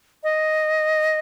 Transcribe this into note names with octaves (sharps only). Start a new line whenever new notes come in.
D#5